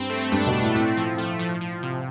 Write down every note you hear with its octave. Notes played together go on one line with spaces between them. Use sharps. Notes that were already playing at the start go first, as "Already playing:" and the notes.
Already playing: G2 C4
A3
G2 D4
B2
A3
A2
A2 C4
F3
A3
F3
F3
C3